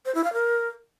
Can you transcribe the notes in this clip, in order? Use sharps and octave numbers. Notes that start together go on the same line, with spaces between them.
C5
E4
F5
A#4